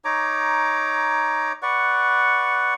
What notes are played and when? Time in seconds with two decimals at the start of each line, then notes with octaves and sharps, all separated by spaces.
0.05 D#4 C#5 A#5 D6
1.62 B4 D5 F#5 C#6